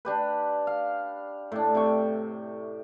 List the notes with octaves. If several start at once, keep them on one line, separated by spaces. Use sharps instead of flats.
D4 G4 B4
F5
A2 D4
C3 G5 C#6